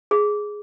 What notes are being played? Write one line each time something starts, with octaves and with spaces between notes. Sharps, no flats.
G#4